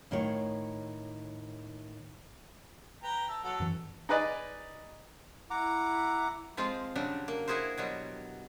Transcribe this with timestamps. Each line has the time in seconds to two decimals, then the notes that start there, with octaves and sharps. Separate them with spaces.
0.11 A2 D#3 F4 C#5
3.03 B4 G5 A#5
3.29 E5 A5
3.44 F#3 A4 F#5
3.60 F#2 E3
4.09 D#4 G#4 B4 D5 D#5
5.51 E4 F#5 A#5 D6
6.57 F3 G#3 C4 F4
6.96 C#3 F#3 G3 D4
7.28 A#3
7.48 E4 F#4 G#4 A#4 C5
7.78 B2 F#3 G3